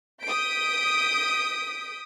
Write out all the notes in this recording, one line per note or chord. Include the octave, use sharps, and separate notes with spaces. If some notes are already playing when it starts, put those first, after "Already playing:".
D#6 G6 B6 D7